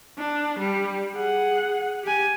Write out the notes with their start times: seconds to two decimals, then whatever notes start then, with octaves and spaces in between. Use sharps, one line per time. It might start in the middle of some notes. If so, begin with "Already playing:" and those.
0.18 D4
0.59 G3
1.14 G#4 F#5
2.04 G4 G#5